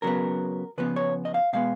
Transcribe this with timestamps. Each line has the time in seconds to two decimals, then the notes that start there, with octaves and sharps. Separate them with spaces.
0.02 C#3 F#3 B3 A#4
0.78 C#3 F3 B3 B4
0.96 C#5
1.25 D#5
1.34 F5
1.53 B2 G#3 B3 F5